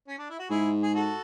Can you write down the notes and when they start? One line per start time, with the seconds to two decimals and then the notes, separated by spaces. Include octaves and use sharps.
0.08 C#4
0.18 D4
0.30 E4
0.39 F#4
0.50 G#2 E4 G#4
0.83 G#4
0.95 F#4 A4